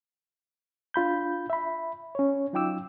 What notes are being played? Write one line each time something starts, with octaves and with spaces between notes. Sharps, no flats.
D4 F4 B5 G6
E5 B5
C#4 C#5
F#3 D#4 F4 G5 D6 E6